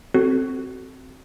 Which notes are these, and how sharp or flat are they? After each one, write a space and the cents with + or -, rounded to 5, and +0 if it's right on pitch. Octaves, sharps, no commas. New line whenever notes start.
C4 +0 F#4 +25 A4 -5